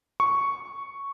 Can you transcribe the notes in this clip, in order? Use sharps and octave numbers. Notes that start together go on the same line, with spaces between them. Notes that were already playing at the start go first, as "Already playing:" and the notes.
C#6